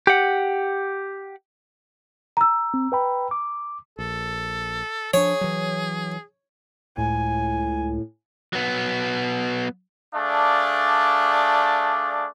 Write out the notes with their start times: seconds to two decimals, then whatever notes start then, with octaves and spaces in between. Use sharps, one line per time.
0.07 G4 F#5
2.37 A#5 E6
2.74 C4
2.92 B4 G5 B5
3.31 D6
3.99 A#1 A4
5.14 F3 D4 G#4 C#5
5.41 E3 F#3
6.97 C#2 A2 G#5
8.53 F#3 B3
10.15 A3 D4 G#4 D5 F5